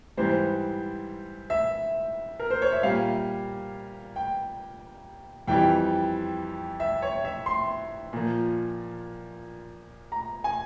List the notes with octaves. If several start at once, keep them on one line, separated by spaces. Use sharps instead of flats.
G#2 E3 G3 C5
E5
A#4
C5
C#5
E5
A#2 G3 F5
G5
F2 E3 G3 G5
E5
C#5
E5
C6
A#2 F3
A#5
G#5